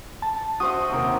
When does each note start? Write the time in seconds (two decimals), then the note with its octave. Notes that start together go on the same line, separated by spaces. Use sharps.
0.22 A5
0.60 F#4 C5 E5 D#6
0.90 D#2 C3 A#4